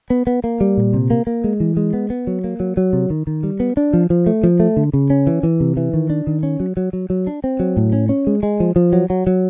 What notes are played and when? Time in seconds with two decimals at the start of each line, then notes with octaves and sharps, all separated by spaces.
0.10 B3
0.27 B3
0.44 A#3
0.61 G3
0.77 A#2
0.94 C3
1.10 A#3
1.27 A#3
1.44 G#3
1.60 E3
1.77 G#3
1.93 B3
2.10 B3
2.27 F#3
2.44 A#3
2.60 F#3
2.77 F#3
2.93 C3
3.10 D#3
3.27 D#3
3.43 G3
3.60 B3
3.77 D4
3.93 F3
4.10 F3
4.27 A3
4.43 F3
4.60 A3
4.77 D3
4.93 C#3
5.10 C#4
5.27 E3
5.43 E3
5.60 C3
5.77 E3
5.94 D#3
6.10 D4
6.27 D#3
6.43 C#4
6.60 F#3
6.77 F#3
6.93 F#3
7.10 F#3
7.27 D4
7.44 C4
7.60 F#3
7.77 A2
7.93 C#4
8.09 C#4
8.27 G#3
8.43 G#3
8.60 F3
8.76 F3
8.93 F#3
9.10 F#3
9.27 F#3